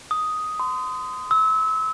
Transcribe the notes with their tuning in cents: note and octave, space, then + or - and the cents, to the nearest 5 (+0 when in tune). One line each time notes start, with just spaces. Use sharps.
D#6 +5
C6 -35
E6 -30